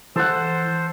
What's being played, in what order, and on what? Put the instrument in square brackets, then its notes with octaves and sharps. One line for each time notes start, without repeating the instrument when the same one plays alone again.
[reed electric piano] E3 [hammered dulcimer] A4 F#5 [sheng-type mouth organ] C5